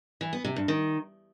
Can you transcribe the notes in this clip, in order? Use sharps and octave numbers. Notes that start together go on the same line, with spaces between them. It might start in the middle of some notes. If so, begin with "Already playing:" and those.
E3
B3
C3
G2
D#3